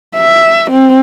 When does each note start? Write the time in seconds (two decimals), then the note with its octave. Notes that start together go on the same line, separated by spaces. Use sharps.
0.16 E5
0.71 C4